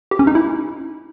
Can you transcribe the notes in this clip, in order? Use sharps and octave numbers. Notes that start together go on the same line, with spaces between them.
G4
C#4
D#4
E4